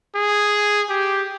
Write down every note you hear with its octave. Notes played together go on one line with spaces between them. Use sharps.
G#4
G4